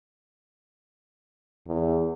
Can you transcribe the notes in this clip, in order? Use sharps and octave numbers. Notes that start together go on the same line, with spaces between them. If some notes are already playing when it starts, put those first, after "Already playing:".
E2